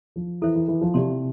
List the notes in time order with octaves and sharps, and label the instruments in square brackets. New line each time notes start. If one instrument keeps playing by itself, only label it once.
[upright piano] F3
[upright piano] E3 [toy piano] E4 A4 C5 E5
[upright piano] E3
E3
F3
[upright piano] C3 [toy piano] G4 D5 A5 C6